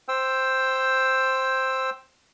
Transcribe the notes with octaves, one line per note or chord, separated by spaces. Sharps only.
C5 G5 E6